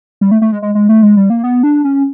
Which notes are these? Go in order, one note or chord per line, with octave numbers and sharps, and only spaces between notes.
G3
A3
A3
G#3
G#3
G#3
A3
G#3
G3
A#3
B3
D4
C#4